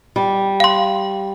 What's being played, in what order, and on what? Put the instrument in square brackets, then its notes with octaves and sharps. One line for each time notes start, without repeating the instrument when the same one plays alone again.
[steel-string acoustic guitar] G3
[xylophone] F5 C6